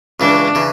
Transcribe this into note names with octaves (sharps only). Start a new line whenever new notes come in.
C#2 C#3 E3 D4
C#3 E3